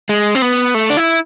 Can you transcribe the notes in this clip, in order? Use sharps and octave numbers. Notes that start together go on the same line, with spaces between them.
G#3
C4
B3
A3
D4
E4